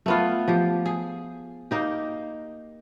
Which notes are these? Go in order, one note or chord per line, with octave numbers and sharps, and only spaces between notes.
A3 B3 F4
F3 G4
G#4
A#3 D#4 G4